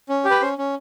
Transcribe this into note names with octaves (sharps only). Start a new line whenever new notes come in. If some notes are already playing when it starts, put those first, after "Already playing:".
C#4
G4
B4
C#4 C5
C#4